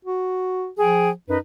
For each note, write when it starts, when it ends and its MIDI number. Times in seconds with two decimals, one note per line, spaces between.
0.05 0.69 66
0.79 1.12 53
0.79 1.10 68
0.79 1.10 79
1.29 1.37 42
1.29 1.37 63
1.29 1.37 71